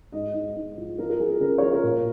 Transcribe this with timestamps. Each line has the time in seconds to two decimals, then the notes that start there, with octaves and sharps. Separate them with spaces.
0.12 G#2 D#5
0.34 G#2
0.56 G#2
0.78 F3
0.98 F3 A#4
1.10 A#4
1.20 F3 G#4
1.30 A#4
1.40 C#3 A#4
1.58 C#5
1.62 F3 A#4
1.73 A#4
1.84 A#2